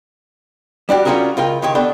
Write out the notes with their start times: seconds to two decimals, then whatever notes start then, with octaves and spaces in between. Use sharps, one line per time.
0.89 G3 D4 F#4 G4
1.05 G3 C#4 F4 F#4 G#4 A#4
1.37 C#2 F4 A#4 G5
1.62 C#2 D#3 G4 C#5
1.75 B3 D4 A4 G5